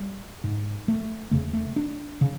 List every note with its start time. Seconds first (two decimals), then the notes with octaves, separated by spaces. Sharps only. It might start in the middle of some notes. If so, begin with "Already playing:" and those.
Already playing: G3
0.44 G#2
0.88 A3
1.31 E2 C#3 A3
1.53 A3
1.76 D4
2.21 C#3